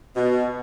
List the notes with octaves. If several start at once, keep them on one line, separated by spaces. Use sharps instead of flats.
B2